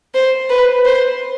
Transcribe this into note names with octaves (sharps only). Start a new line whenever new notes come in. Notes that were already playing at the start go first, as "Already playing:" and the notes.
C5
B4
C5